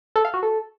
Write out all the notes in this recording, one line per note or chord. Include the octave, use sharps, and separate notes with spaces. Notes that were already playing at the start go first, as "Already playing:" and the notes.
A4
F5
F#4
A4